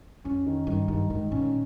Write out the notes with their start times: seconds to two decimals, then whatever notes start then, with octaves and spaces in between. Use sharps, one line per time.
0.25 F2 C#4
0.46 D#3
0.67 G2 D#3
0.88 G2 D#3
1.10 G#2 D#3
1.31 A#2 C#4